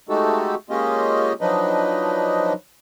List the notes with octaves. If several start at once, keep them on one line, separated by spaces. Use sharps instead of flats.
G#3 A3 D#4 F#4 G4 A4
G#3 A#3 C#4 F4 G4 D#5
F3 F#3 D4 D#4 B4 D#5